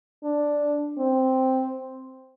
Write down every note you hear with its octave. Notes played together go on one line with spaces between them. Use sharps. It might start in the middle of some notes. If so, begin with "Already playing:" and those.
D4
C4